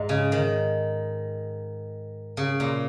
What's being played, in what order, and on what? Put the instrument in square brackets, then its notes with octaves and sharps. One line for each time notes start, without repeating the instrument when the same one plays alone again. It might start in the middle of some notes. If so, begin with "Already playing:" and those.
Already playing: [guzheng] G#2
C#3
D#3
C#3
A#2